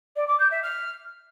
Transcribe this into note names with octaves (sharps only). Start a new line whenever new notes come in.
D5
D6
G6
E5
F6